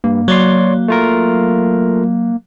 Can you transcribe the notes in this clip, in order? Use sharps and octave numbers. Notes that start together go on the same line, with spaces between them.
G2 A#3
F#3 C#5 D5 C6
A3 F4 A#4